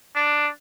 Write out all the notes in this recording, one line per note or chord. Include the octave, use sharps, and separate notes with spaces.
D4